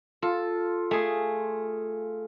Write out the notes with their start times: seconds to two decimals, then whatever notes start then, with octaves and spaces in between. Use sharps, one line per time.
0.22 F4 A4
0.91 A3 G#4 G#5 D#6